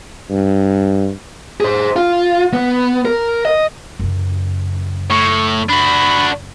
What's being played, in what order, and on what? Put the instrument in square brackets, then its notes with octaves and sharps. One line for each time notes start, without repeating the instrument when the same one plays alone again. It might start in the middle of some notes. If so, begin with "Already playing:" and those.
[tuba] G2
[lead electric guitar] G#4 C5
F4
B3
A#4
D#5
[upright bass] F#2 C#3
[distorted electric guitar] A2 [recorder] C#6
[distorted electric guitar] D4 F#4 [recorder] B5